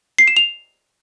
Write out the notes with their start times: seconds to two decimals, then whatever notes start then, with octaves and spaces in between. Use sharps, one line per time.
0.19 C7
0.28 E7
0.36 F7